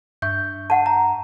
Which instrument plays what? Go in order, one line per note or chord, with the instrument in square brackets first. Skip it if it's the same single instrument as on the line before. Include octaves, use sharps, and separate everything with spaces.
[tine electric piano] G2 E5 C#6 [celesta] G6
[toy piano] F#5 A5
[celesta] A#5